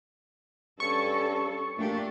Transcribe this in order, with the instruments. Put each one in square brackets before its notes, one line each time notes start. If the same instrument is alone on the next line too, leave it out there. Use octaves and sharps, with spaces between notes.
[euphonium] G2 [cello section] C#4 A4 [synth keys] C#6
[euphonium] A#2 [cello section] A3 D4 G4